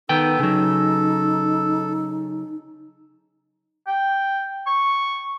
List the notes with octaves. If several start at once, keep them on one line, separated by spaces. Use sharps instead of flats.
D#3 B3 D#4 A4 G5
C#3 F#3 D#4
G5
C#6